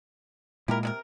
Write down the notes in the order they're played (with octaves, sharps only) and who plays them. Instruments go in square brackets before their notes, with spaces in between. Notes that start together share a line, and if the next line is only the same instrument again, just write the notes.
[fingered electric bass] A#2 G#3 A#3 [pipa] E4 G4 A#4
[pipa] C3 E4 A#4